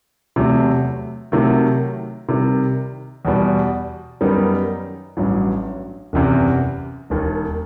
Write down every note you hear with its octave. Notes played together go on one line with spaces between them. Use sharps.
E2 C3 F#3 A3
C3 D#3 F#3 A3
C3 D#3 G3
E2 B2 G3
F#2 D#3 G3 B3 D#4
A1 G2 F#3
F#1 E2 C3
E1 D#2 D#3